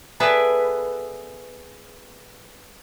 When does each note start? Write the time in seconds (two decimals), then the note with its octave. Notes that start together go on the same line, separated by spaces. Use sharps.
0.20 B3 G#4 A4 B4 D5 E5